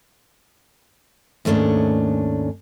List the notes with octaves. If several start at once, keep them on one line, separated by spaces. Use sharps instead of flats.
D#2 G#2 A3 C#4 D4